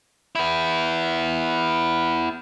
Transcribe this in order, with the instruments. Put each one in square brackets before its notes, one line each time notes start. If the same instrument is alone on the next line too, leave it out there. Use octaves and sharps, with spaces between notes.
[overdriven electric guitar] B3 E4